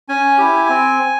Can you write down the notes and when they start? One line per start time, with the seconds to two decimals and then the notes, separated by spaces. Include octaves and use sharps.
0.09 C#4 G#5
0.38 E4 G4
0.69 C4